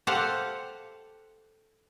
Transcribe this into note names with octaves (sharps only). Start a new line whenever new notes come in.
G4 A4 C5 F5 F#5